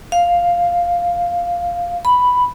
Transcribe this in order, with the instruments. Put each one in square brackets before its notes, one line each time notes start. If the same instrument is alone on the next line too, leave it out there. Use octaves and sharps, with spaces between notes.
[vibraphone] F5
B5